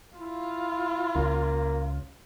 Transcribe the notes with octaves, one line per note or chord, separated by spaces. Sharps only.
E4 F4
C#2 A#3